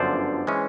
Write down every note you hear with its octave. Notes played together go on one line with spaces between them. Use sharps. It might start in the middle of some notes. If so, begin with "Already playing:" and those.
Already playing: G1 F#2 D3 F3 C5 D5
E3 G#3 C#4